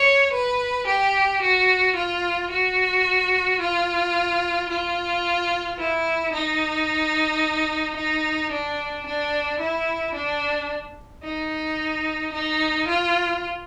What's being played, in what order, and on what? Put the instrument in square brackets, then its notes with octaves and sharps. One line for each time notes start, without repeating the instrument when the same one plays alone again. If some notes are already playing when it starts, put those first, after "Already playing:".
Already playing: [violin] C#5
B4
G4
F#4
F4
F#4
F4
F4
E4
D#4
D#4
D4
D4
E4
D4
D#4
D#4
F4